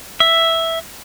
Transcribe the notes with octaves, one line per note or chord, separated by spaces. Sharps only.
E5